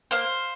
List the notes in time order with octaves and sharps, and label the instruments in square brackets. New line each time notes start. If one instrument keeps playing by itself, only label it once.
[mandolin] A#3 C5 F5